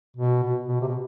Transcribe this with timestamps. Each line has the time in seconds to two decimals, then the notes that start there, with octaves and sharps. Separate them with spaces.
0.17 B2
0.43 B2
0.68 B2
0.81 C3
0.88 B2